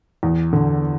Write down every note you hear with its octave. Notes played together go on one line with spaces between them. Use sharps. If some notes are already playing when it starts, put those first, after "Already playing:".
E2
D3